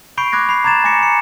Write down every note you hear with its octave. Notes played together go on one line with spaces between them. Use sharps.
B5 C#6 G6 C7 D7
B5 D6 F#6 G#6 A#6
B5 C7 F7
A#5 D6 G#6 A6 E7
G#5 A#5 D6 A#6 C#7 E7
D6 C#7